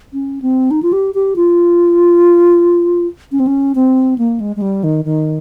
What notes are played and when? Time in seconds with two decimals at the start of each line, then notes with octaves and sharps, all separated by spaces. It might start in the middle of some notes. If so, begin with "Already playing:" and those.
0.13 C#4
0.42 C4
0.71 D#4
0.83 F4
0.93 G4
1.15 G4
1.36 F4
3.32 C#4
3.40 C4
3.47 C#4
3.75 C4
4.18 A#3
4.40 G#3
4.56 G#3
4.62 G3
4.84 D#3
5.05 D#3